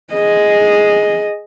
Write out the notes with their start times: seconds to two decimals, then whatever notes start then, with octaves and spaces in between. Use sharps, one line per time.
0.13 G#4 D#5